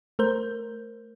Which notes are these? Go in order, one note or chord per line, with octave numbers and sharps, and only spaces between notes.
A3 A#4 C5 G6